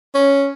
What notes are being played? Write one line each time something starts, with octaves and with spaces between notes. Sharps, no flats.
C#4